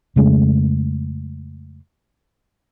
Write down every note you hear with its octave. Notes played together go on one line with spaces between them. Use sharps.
F2 C#3 G#3 A3